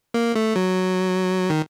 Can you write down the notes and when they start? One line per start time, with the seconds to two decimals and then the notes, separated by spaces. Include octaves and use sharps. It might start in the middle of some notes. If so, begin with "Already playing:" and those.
0.14 A#3
0.35 A3
0.56 F#3
1.50 D#3